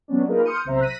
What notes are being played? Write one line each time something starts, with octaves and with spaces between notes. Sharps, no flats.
F#3 B3 C#4 D4
A#3 D#4 F4 G#4 A#4 B4
C6 D#6 F6 G6 C#7 D#7
B1 C3 C5 E5 A#5
F#6 A#6 B6 D#7